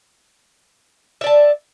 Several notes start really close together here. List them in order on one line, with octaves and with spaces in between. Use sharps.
E5 D5 A5